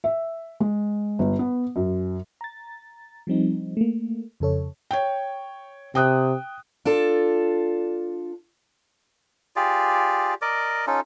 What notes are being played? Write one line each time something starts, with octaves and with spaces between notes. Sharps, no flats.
E5
G#3
G1
B3
F#2
A#5 A6
F3 G3 C4 D#4
A3 A#3
F2 C#3 A4 C#5
C#5 G5
C3 G5 D#6 F#6
D4 F4 A4
F4 G4 G#4 D5
A#4 D5 D#5 D6
C#4 D#4 F4 A4